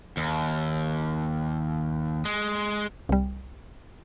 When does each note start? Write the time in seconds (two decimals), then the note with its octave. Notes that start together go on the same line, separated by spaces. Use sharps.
0.17 D#2
2.25 G#3
3.09 C2 G3